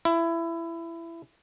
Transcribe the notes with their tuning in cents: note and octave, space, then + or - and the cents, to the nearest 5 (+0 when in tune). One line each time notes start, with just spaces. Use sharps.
E4 +20